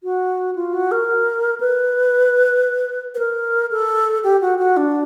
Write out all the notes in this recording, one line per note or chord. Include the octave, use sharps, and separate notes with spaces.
F#4
F4
F#4
A#4
B4
B4
A#4
A4
G4
F#4
F#4
D4